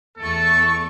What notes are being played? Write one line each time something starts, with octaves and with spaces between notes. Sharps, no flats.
E2 A3 A4 C#6